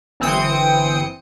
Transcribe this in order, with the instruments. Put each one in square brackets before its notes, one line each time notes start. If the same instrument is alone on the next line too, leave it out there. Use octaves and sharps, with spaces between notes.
[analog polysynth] G1 E3 C4 G5 D#6 C#7